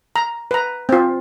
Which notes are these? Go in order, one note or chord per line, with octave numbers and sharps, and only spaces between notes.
A#5
B4 A#5
C4 F4